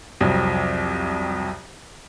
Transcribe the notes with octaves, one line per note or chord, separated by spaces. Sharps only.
C2 F2 F#3